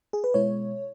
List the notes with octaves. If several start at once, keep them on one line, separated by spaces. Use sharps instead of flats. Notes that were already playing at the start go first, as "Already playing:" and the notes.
G#4
B4
B2 G#3 E4 C#5